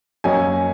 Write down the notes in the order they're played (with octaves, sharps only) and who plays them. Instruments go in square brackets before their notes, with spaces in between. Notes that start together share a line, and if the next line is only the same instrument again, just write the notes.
[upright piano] F#2 F#3 A#3 C#4 D#5 G#5